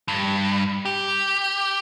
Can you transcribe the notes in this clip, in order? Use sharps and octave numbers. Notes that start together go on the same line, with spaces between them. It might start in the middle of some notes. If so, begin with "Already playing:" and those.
G2
G4